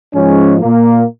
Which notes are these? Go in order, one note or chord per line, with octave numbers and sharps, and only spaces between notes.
G#2 F3 G#3 C#4
A#2 A#3